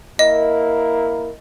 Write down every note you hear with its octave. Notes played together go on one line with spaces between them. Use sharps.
A#3 E4 A#4 D#5